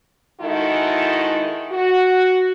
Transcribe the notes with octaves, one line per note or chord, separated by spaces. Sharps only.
D#3 G#3 D#4 E4 F#4 A4
F#4